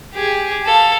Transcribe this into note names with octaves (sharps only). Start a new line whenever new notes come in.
G4 G#4
A4 F5